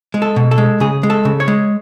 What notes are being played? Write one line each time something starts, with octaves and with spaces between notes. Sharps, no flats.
G#3
A4
B2
A4
G#3
C#3 G#4
G#3
A4
C#3
C#5
G#3